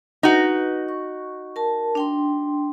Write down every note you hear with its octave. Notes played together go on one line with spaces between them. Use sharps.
D#4 F#4 B4
C#6
A#4 A5
D4 G5 C6